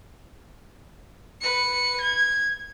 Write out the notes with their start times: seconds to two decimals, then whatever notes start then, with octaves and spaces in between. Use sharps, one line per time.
1.41 B4 C#7
2.00 G#6